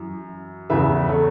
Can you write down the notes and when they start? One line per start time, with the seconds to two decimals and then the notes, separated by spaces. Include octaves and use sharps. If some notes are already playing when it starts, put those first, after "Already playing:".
Already playing: F#2 E3
0.70 E2 C#3 E3 B4 E5
1.09 A4 C#5